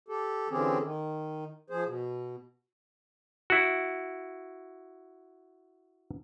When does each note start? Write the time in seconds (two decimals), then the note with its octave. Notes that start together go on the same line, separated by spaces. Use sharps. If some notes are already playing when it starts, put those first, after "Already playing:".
0.08 G4 A4
0.50 D3 E3 C4 C#4 G4 G#4
0.81 D#3
1.70 F3 G#4 C5
1.85 B2
3.50 E4 F#4